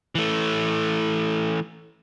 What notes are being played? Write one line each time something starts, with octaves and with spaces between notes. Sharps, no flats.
E3 A3